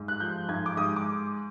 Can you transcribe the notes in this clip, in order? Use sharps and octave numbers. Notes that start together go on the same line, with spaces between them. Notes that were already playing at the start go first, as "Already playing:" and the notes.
Already playing: G#2
F#6
F3 G6
G#2 G#6
D6
G#2 D#6
D6